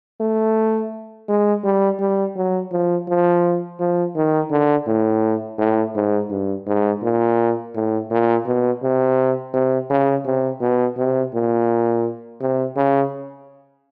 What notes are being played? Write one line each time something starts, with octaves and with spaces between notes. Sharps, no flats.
A3
G#3
G3
G3
F#3
F3
F3
F3
D#3
D3
A2
A2
G#2
G2
G#2
A#2
A2
A#2
B2
C3
C3
C#3
C3
B2
C3
A#2
C3
C#3